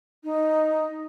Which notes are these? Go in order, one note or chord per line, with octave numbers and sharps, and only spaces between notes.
D#4